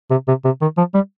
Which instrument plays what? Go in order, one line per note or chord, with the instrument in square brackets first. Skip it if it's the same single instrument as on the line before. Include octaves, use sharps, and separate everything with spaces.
[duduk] C3
C3
C3
D#3
F3
G3